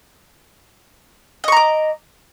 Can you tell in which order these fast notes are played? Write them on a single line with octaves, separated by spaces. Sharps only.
D#5 C#6 A#5 D6